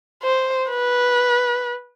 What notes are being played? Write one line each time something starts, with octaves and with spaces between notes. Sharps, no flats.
C5
B4